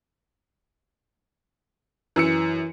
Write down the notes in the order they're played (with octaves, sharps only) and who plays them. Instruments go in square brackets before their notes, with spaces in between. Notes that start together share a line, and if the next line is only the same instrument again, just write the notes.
[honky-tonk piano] F#2 E6 C#7 [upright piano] E3